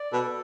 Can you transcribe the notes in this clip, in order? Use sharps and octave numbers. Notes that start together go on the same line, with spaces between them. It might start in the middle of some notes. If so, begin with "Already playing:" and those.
Already playing: D5
B2 A4